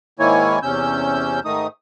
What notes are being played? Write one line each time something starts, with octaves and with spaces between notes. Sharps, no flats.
G#2 D#3 A#3 E4 C#5 G#5
E2 C3 C#4 E6 G6
G#2 D#3 A3 D#4 D#6